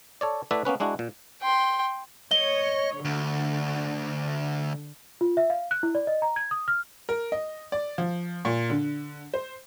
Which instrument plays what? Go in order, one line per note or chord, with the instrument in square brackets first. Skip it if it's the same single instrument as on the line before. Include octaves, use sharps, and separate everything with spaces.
[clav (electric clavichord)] A4 C#5 D5
A3 E4 B4 D5 E5 F#5
A#3 B3 C#4 B4
G#3 D4 E4 F#4
A#2
[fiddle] G5 C6
[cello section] C#5 [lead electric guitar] D#5 [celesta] G7
[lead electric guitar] D2 [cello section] D3
[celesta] F4
E5
F5
F#6
E4
D5
D#5
A#5
G#6
D#6
F6
[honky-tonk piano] A#4
D#5
D5
F3
A#2
D3
C5